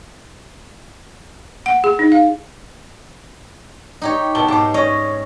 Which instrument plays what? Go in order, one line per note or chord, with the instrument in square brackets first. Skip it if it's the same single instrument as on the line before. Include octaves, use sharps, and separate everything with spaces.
[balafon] F#5
G#4
D#4
F5
[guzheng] D#4 G4 C#5
[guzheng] B2 [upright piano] A5 G7
[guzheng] G#2 C5 [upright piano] A5 D6
[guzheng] C#4 D#5 [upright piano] C#5